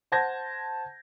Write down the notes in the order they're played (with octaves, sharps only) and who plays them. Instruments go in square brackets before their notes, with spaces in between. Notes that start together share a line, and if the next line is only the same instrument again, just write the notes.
[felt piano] C5 F#5 A5 G6 G#6 A#6